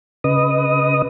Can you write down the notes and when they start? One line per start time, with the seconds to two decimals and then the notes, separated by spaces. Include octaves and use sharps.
0.24 C#3 B4 D#5 D#6